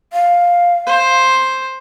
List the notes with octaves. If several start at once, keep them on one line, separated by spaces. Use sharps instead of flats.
F5
C5